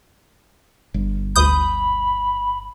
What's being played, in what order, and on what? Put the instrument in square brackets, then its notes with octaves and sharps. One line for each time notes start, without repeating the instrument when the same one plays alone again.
[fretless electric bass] G1
[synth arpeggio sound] D2 D#6 G6 [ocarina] B5